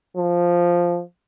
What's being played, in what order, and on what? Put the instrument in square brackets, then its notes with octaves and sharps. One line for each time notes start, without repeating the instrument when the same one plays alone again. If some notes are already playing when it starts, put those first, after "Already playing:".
[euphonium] F3